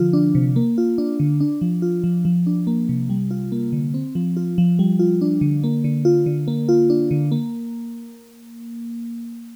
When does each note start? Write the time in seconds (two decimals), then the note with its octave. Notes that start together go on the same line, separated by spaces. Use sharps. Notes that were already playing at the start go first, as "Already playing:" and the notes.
Already playing: D3 F3 F4
0.13 D4
0.35 C3
0.56 A#3
0.78 F4
0.98 D4
1.20 D3
1.40 D4
1.61 F3
1.82 F4
2.04 F3
2.25 F3
2.47 D4
2.67 A#3
2.89 C3
3.10 G3
3.31 F4
3.52 A#3
3.72 D3
3.94 C4
4.15 F3
4.37 F4
4.58 F3
4.79 G3
4.99 F4
5.21 D4
5.41 D3
5.64 A#3
5.84 D3
6.05 F4
6.26 D3
6.48 A#3
6.69 F4
6.90 D4
7.11 D3
7.32 A#3